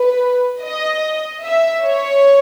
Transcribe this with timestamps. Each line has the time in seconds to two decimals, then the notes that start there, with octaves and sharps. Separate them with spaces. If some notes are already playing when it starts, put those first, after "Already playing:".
Already playing: B4
0.61 D#5
1.43 E5
1.85 C#5